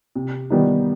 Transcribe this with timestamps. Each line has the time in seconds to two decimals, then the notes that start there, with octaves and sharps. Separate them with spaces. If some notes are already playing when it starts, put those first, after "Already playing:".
0.16 C3
0.50 D#3 G3 B3 D#4